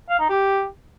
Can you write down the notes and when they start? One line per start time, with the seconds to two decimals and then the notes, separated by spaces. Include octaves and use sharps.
0.09 F5
0.19 D#4
0.29 G4